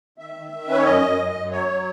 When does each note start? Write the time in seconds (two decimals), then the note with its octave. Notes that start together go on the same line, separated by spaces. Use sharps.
0.18 D#3 E5
0.35 D#3
0.52 D#3
0.68 C#4 B4
0.77 C#5
0.84 F#2 D#5
1.02 F#2
1.18 F#2
1.35 F#2
1.51 F#3 C#5
1.67 F#3